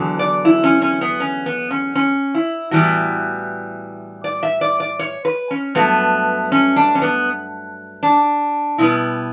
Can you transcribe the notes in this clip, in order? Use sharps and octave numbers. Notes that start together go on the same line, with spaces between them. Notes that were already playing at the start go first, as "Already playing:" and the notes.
Already playing: E2 D3 F#3
D5
E4
C#4
C#4
B3
C#4
B3
C#4
C#4
E4
A2 E3 G3 B3 F#4
D5
E5
D5
D5
C#5
B4
C#4
G2 F#3 A3 B3
C#4
D4
C#4
B3
D4
B2 G3 B3 E4